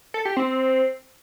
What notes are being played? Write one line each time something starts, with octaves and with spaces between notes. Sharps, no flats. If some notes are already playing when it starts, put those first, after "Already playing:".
A4
G4
C4